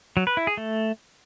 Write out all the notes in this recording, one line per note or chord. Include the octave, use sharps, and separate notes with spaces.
F#3
B4
E4
G#4
A3